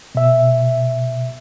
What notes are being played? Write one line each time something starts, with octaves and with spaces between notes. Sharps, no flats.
B2 E5